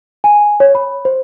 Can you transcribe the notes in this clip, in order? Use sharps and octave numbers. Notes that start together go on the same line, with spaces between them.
G#5
C#5
B5
C5